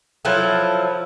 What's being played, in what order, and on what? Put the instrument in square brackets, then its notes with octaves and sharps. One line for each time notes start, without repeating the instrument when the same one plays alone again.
[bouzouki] F3 F#3 E4 A4